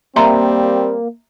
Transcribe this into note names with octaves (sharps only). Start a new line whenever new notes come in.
G3 A#3 C4 E5 A#5 C6